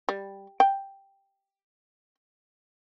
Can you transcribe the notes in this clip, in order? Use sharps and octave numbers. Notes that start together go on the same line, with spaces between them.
G3
G5